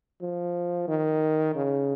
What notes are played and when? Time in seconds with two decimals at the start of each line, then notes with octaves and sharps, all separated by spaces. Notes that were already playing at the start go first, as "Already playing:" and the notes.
0.22 F3
0.88 D#3
1.55 C#3